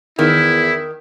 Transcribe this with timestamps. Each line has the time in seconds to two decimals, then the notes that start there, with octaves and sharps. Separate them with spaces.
0.19 E2 D#3 E4